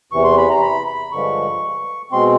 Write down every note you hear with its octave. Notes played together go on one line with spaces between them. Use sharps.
E2 C3 E3 C#6
C6
B5
A#5
B5
B5
G2 D3 F3 G#3 C#6
B2 G#3 C4 C6